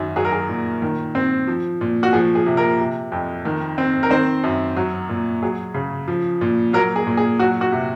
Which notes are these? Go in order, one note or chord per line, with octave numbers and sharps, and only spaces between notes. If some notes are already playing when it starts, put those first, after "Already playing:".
Already playing: F#2 D#3
F#3 G#4
A#4
G#4
A#2
D#3
C4
F3
A#2
F#4
F3 G#4
G#4
C3
A#3 A#4
C3
F2
D#3
C4
A#4
D#3 C4 C5
F#2
F#3
A#2
F#3 G#4
C#3
F3
A#2
F#3 A#3 A#4
G#4
A#2
G#4
F#3 F#4
F#4
C3